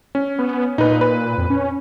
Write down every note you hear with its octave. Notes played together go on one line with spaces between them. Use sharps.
C#4
B3
A#2 D#4 B4
B4
F2
C#4